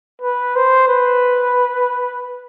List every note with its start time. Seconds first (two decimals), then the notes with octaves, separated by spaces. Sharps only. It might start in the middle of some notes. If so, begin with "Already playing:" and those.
0.22 B4
0.56 C5
0.89 B4